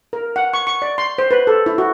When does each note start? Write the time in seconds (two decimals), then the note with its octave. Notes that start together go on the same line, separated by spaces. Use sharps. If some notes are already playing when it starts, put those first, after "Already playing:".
0.13 A#4
0.36 F#5
0.54 C#6
0.67 C#6
0.82 D5
0.98 C6
1.18 C5
1.31 B4
1.47 A4
1.66 E4
1.78 F#4